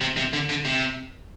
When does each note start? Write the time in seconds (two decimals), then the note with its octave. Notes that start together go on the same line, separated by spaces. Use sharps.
0.01 C3
0.17 C3
0.33 D3
0.49 D3
0.65 C3